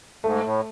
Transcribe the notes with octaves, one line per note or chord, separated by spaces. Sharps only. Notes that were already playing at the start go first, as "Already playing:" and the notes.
G#2 A3
A2